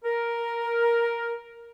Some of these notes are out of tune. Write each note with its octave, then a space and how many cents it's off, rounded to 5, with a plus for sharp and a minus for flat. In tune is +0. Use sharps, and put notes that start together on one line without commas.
A#4 +5